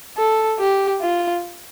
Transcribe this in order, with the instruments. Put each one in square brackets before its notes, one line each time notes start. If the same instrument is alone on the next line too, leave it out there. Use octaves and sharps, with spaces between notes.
[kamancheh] A4
G4
F4